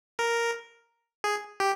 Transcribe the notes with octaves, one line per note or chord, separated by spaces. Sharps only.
A#4
G#4
G4